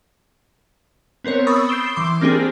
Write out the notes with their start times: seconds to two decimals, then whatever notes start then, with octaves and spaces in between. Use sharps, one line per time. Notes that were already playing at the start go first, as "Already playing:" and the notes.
1.24 B3 C4 A#4 C#5
1.47 B5 C#6 D#6 E6 A6
1.69 G6 C7 D7 E7 G7
1.96 E3 C6 D6
2.21 A#3 C4 D4 G4 G#4